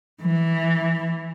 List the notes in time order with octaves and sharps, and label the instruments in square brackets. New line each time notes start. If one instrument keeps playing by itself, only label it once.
[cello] E3